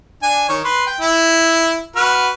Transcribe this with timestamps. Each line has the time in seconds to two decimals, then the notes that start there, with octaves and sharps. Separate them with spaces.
0.23 D4 G#5
0.49 D#3 C#5
0.65 B4 C6
0.86 G5
1.01 E4
1.96 F#4 B4 F6